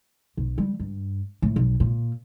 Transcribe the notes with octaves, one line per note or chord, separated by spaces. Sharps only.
B1
G3
G2
A2
B1
A#2